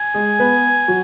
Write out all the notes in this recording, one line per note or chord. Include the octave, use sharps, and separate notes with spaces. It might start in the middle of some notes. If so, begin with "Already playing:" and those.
Already playing: G#5
G#3 G#4
B3 B4
F#3 F#4